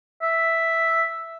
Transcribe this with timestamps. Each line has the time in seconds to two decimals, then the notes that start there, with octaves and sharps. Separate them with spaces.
0.22 E5